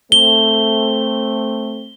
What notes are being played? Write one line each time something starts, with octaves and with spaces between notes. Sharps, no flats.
A3 C4 G7